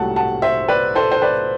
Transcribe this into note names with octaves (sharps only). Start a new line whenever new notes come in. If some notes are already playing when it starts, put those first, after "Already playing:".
Already playing: C2 C3 F#3 A3 F#5 A5
F#5 A5
C5 E5
B4 D5
A4 C5
C5
B4 D5